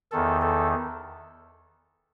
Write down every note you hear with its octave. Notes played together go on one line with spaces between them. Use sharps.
E2 D#3 A4
A4